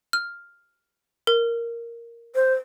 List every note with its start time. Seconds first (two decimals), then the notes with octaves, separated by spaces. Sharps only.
0.13 F6
1.27 A#4
2.35 C5